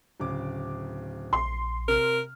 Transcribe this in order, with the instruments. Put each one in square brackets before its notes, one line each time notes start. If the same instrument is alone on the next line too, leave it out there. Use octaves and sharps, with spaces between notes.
[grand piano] D1 C#3 D6
[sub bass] A#1 [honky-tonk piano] C6
[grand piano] C3 F6 [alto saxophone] A#4